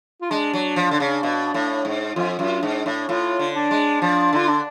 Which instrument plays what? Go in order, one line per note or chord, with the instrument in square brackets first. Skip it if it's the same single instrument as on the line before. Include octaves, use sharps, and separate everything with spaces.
[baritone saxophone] F4
[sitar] G#3 [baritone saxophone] D4
[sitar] F#3
F3
D3
C#3
B2
A2
G#2
[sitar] F2 [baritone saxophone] F4
[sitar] F#2 [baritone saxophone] F4
[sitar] G#2 [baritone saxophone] D4
[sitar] A2
[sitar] A2 [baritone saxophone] F4
[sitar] D3
[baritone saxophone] D4
[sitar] G#3
[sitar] F3 [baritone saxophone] D4
[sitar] D3 [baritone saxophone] F4
[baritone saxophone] D4